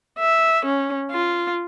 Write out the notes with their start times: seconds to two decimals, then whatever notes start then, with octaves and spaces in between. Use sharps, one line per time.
0.19 E5
0.66 C#4
1.12 F4